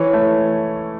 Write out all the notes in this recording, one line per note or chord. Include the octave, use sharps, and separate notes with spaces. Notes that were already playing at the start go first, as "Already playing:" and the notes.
Already playing: E3 C#5
A3